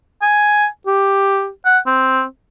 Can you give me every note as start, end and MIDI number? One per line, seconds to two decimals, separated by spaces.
0.22 0.66 80
0.87 1.49 67
1.66 1.79 78
1.87 2.24 60